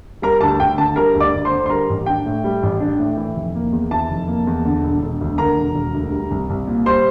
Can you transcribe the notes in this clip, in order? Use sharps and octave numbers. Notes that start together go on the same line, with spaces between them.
G3 A#4 A#5
D2 A5
D2 G5
D3 A5
G3 A#4 A#5
D2
D5 D6
D2
C5 C6
D3
C6
G3 A#4 A#5
A1
D4 G5
A2
G3
A1
D4
A2
E3
F1
A#3
E2
E3 A5
F1
A#3
E2
D3
E1
E1
D2
D3 A#4 A#5
E1
E1
D2
G3
C2
C2
A#2
G3 C5 C6